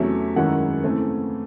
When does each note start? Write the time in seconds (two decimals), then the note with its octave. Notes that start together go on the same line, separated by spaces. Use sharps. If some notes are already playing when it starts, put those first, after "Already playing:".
Already playing: E2 C3 F#3 A3 C#4 E5
0.36 F#2 D#3 G#3 C#4 E4 F#5
0.83 C#3 E3 A3 C4